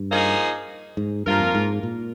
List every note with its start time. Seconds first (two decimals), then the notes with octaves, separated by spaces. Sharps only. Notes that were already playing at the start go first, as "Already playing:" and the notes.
Already playing: G2
0.11 F3 A#3 D#4 G#4
0.97 G#2
1.27 G2 F3 A#3 F4 A#4
1.40 F2
1.55 G#2
1.83 A#2